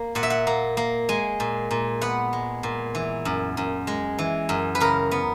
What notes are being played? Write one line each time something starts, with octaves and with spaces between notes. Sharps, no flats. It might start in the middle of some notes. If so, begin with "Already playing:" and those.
Already playing: A#3
A#2 F#5
E5
F#5
A#3
A#3
G#3 G#5
A#2
A#2
B3 F#5
G#3
A#2
E3
F#2
F#2
G#3
E3
F#2
B4
C#3 A#4
B3